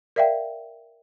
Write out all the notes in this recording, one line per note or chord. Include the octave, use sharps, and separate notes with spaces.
A#4 D5 E5 F5 G5